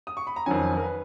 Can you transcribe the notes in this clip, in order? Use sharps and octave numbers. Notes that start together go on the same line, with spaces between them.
D#6
C#6
B5
A#5
F2 D#3 F#3 C#4 G#5
A#4
B4